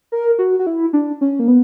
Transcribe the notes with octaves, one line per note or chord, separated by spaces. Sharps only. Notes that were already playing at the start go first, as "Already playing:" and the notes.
A#4
F#4
F#4
E4
D4
C#4
A#3
B3